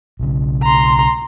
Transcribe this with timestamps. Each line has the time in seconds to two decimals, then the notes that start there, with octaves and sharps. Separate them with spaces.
0.20 B1 C#3
0.63 A#5 C6